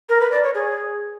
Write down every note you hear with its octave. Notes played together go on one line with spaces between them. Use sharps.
A#4
B4
D5
C#5
G#4